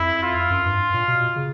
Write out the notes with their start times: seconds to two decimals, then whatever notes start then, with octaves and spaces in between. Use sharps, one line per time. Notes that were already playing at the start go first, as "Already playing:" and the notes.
Already playing: F2 E4
0.23 F4
0.50 F#2
0.66 G2
0.94 A#2
1.08 B2
1.36 C#3